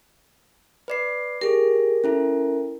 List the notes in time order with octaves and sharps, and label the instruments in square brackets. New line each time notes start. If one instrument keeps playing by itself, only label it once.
[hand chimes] B4 D5 C7
[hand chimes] G4 G#4 [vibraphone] A#4
[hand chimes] C#4 E4 A4